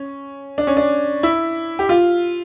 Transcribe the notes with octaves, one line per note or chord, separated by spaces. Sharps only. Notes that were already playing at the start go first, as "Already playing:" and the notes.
Already playing: C#4
D4
C#4
D4
E4
G4
F4